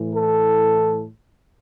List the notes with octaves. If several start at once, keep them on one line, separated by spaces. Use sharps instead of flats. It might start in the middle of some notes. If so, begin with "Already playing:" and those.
Already playing: A2 E3
A4